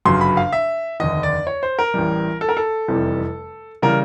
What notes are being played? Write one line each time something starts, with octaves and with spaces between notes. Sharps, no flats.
G1 F#2 C#3 F#3 C6
B5
F5
E5
F1 D#2 D3 D#5
D5
C#5
C5
A#4
A1 A2 E3 G3
A4
A#4
A4
F1 E2 C3 E3 G3
C#3 E3 G3 A#4